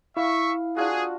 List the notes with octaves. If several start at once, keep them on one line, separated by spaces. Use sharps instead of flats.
E4 E5 F5 C#6
D4 F4 F#4 G#4